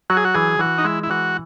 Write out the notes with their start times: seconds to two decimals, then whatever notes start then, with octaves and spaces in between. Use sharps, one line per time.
0.10 F#3 F#4
0.17 G#4
0.25 F#4
0.34 E3 G#4
0.59 E3 F#4
0.78 D#4
0.85 G#3 E4
1.03 E4
1.10 E3 F#4